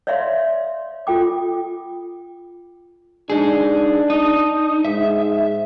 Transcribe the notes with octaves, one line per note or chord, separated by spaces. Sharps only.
C#5 D5 E5 F5 C6
F4 A4 G5 D6
D4 D#4 G#4
D#4
G#2 E5